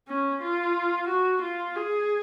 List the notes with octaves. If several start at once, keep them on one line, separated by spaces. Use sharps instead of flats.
C#4
F4
F#4
F4
G#4